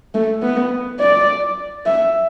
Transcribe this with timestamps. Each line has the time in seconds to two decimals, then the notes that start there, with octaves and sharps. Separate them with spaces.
0.15 A3
0.43 B3
1.00 D5
1.86 E5